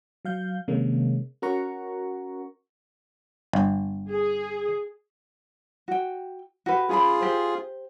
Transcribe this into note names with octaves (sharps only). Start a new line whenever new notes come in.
F#3 F5 G6
C3 D#3 G#3 A#3 C#4
C#4 F#4 A#4 F#5 A#5 C#6
G1
G#4
F#4 G5
F#4 G4 B4
C#4 F4 G#4 G#5 B5
G4 C5